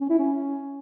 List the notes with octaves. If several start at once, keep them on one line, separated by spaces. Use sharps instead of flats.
C#4
E4
C#4